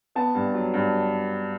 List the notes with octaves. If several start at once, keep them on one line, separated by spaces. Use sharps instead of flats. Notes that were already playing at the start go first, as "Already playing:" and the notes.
B3 A5
G2
F#3
G2